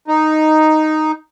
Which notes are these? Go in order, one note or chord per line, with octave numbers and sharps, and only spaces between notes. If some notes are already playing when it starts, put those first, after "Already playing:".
D#4